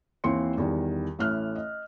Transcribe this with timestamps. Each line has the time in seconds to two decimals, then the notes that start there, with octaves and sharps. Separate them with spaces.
0.24 D#2 E3 C4 C6 C#7
0.58 E2 D#3 G3
1.19 A1 A3 E4 C#5 F6 F#6
1.55 D#5